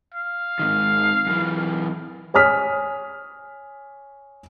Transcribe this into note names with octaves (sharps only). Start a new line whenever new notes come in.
F5
G#2 D#3
F#2 E3
C#5 G#5 D#6 F6 B6